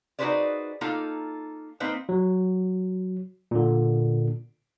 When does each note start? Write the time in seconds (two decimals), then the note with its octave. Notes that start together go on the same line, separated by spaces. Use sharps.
0.19 D#4 F#4 G#4 B4 C5 D5
0.81 A#3 D#4 F4 A4
1.80 A#3 C4 D#4 B4 C5
2.09 F#3
3.51 A#2 D3